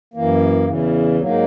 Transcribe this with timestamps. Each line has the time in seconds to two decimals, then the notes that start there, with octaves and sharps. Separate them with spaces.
0.14 F#2 E3 A#3
0.66 E2 C#3 E3
1.17 G#2 F#3 A#3